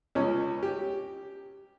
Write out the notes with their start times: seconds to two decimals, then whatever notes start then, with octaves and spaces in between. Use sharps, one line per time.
0.15 C#2 C#4
0.63 G4